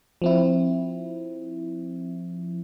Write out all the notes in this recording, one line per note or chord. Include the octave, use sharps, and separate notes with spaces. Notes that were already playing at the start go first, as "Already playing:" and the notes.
F3 C4 E4